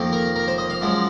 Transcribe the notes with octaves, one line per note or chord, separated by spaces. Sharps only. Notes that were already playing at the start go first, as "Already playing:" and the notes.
Already playing: F2 D#3 A#3
A#4
A#4
C5
D#5
F5
F#2 F3 G#3